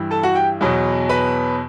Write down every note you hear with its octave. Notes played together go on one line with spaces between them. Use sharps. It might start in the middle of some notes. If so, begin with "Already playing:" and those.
Already playing: G2 E3 G3
A4 A5
F#4 F#5
G4 G5
E2 B2 F#3
B4 B5